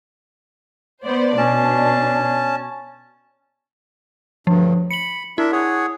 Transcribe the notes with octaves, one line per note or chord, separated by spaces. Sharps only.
B3 C5 D5
B2 C#4 D4 A5
D2 G2 F3
B5 C#7 F#7
D4 E4 A#4 E5
G#4 C#5 F#5